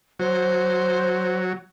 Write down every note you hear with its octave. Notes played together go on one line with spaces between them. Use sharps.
F#3 C5